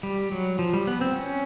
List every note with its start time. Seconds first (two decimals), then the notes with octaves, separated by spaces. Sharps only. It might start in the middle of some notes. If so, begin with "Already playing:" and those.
0.03 G3
0.31 F#3
0.59 F3
0.73 G3
0.87 B3
1.01 C4
1.16 C#4